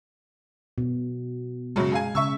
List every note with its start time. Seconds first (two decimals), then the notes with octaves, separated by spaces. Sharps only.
0.78 B2
1.76 F#2 C#3 F#3 G#3
1.92 G#4 F5 G#5
2.15 C#3 E5 C#6 E6